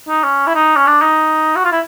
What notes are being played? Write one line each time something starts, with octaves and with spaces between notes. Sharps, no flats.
D#4
C#4
E4
D#4
C#4
D4
D#4
F#4
F4
E4